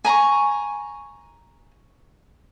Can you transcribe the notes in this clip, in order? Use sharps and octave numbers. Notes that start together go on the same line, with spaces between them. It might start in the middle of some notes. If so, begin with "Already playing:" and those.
G#5 A#5 B5 C#6